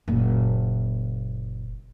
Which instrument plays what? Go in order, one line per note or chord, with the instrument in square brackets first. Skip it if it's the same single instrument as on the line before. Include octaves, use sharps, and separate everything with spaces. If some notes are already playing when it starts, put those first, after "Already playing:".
[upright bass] F#1 A#2